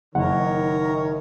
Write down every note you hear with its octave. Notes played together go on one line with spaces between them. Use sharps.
F#1 D#3 A#4 C#5 F#5